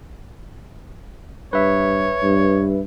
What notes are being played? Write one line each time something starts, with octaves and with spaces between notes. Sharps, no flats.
G2 B4 C#5 E5
G2